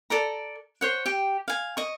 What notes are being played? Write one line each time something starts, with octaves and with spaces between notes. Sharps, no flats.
A4 D5 A#5
C5 C#5 F#5
G4 G5
F5 G#5
D#5 C#6